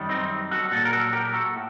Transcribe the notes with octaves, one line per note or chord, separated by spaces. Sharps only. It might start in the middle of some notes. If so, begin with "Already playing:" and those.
Already playing: F#2 D#3 G3
C4 D#4
F#4 A4
A#2 F#3 F#4 A4
A#4
F#4 A4
G4 A#4
F#4 A4
A2